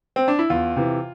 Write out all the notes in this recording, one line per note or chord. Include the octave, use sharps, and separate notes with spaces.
C4
D4
E4
E2 F4
C3 E3